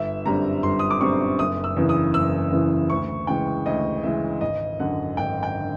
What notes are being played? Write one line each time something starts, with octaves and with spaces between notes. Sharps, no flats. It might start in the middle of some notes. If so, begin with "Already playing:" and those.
Already playing: G1 E5
F#2 D3 G3 C4 A#5
G1 C6
D#6
D6
F#2 D3 G3 C4 C#6
F#1 D#6
E6
E2 C#3 E3
D#6
F#1 E6
E2 C#3 E3
D2 C#6
C#3 E3 G#3 G5
D2 D#5
C#3 E3 G#3 E5
G#1 D#5
F#2 D3 F#5
G#1 G5
G5
D3